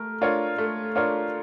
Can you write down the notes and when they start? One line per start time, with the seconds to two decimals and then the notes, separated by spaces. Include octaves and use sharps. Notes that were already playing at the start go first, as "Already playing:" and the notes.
Already playing: A3 A#4
0.21 D4 F4 A#4 C#5
0.58 A3
0.95 D4 F4 A#4 C#5